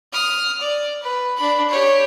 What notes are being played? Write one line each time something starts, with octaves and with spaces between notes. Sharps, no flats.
D#6 F6
D5
B4
D4 B5
G4 C#5